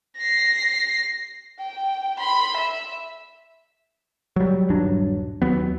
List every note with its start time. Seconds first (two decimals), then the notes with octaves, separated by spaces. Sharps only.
0.18 A#6 C7
1.59 G5
2.18 B5 C6
2.57 E5
4.36 F#3 G3
4.70 D#1 G2 F#3 D4
5.42 D#2 F#3 B3